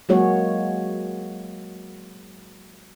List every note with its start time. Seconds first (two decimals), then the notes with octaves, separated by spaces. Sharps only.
0.09 F#3 G#3 A#3 F#4 G#4 C#5